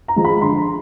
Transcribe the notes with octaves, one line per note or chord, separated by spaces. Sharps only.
A#5
F3 G#3
B5
D3 C6
A#5